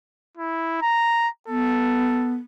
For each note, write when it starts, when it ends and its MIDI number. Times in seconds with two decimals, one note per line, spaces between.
0.37 0.79 64
0.82 1.28 82
1.48 2.34 59
1.48 2.40 69